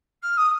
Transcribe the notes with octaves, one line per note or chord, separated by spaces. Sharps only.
F6
D#6